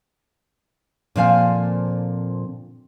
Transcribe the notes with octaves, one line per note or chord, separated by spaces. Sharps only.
A#2 D3 F3 C4 F5 G#5